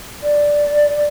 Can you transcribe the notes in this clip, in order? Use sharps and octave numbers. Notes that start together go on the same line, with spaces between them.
D5